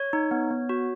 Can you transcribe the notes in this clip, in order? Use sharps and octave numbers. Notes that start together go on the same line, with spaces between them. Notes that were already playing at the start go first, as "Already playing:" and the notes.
Already playing: C#5
D#4
B3
B3
F#4